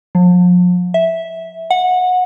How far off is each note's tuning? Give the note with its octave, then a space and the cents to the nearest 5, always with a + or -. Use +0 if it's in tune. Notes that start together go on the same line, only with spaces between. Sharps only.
F3 +40
E5 -10
F#5 -20